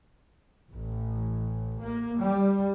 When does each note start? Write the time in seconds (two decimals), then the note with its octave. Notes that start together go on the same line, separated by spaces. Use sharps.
0.71 A1
1.81 A#3
2.20 G3